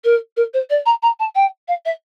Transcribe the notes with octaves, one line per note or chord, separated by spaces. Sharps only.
A#4
A#4
C5
D5
A#5
A#5
A5
G5
F5
E5